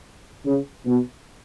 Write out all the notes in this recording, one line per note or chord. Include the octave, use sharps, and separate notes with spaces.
C#3
B2